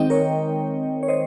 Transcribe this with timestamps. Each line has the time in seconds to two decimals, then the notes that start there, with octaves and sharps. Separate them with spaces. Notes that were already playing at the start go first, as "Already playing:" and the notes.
Already playing: D#3 G#3 C4 D#4 D#5 G5
0.10 A#4 C#5
1.03 C#5
1.08 C5 D#5